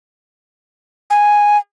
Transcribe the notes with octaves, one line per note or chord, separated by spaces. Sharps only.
G#5